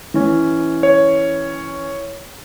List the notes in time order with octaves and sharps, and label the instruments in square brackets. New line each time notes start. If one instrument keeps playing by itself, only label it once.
[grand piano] E3 C#4
[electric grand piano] C#5